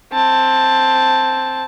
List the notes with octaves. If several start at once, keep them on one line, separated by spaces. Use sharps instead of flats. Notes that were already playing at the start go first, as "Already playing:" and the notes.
C4 A5